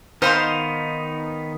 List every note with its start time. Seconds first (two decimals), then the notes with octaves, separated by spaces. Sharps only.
0.22 D#3 B3 D#4 C5 F5 C6